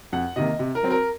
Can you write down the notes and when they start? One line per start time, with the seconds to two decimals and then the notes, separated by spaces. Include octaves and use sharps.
0.13 F2 F#5
0.36 C3 D#3 A#3 D#5
0.59 C3
0.75 A#4
0.83 F#3 C4
0.91 A#4